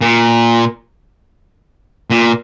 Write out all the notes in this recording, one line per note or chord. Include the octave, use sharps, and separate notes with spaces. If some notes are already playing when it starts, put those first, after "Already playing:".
A#2
A#2